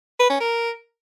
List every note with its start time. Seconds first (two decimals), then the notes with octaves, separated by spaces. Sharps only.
0.20 B4
0.30 C#4
0.40 A#4